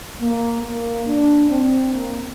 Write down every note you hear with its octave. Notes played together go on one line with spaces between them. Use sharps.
A#3
A#3
D4
C4
A#3